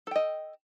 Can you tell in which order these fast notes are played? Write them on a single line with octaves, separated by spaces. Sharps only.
A4 G5 D#5